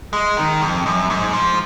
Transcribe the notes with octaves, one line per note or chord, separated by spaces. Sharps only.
G#3
D#3
F2
F#2
G#2
F3